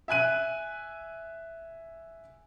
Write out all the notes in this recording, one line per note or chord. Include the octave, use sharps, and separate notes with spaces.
E5 G#5 F#6 D#7